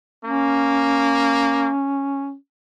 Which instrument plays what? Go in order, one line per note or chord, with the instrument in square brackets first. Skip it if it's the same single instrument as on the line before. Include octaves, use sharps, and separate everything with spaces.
[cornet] A#3 [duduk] C#4